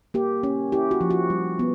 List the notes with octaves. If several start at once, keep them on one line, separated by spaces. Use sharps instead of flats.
A#3 G4
C#4
E4 G4
F#4
F3
F#4
G3
B3